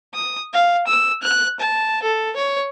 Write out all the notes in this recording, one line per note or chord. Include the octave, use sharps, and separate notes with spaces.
D#6
F5
E6
F#6
A5
A4
C#5